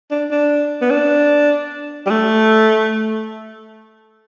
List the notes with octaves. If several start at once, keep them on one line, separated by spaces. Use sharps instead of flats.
D4
D4
B3
D4
G3
A3